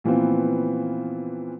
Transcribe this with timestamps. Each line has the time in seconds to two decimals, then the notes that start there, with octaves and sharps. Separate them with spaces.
0.04 A#2 E3 F3 B3 C4